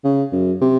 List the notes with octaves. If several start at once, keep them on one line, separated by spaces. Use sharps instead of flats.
C#3
F#2
C3